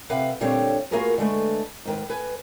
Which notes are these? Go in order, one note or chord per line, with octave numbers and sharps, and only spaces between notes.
C3 B4 F5 F#5
A#2 D3 G3 C4 C#5 F5
A#3 F4 F#4 G#4 A#4 B4
D3 G#3 A3 B4
G#2 D#3 B4
B4 G#5